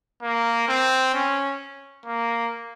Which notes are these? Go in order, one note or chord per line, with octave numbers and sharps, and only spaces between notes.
A#3
C4
C#4
A#3